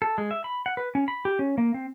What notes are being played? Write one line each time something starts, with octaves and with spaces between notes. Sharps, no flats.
A4
G#3
E5
B5
F#5
B4
C#4
B5
G4
C#4
A#3
C4